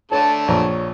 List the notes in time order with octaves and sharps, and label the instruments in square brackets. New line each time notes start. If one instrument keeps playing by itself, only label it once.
[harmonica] D3 A3 A4 [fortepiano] C#5 [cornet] A5
[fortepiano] A#1 A#5 [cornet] C#5